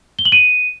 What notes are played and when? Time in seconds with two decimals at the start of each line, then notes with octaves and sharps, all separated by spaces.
0.19 G7
0.25 F#7
0.32 D#7